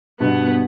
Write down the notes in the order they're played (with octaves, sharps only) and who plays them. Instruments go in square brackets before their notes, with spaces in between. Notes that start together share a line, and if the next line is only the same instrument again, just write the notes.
[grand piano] G2 B2 [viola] B3